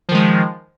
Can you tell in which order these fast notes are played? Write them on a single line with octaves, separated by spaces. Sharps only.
F3 D#3 G#3